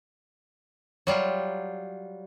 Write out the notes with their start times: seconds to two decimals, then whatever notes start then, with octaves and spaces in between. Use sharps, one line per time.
1.07 F#3 G3 F4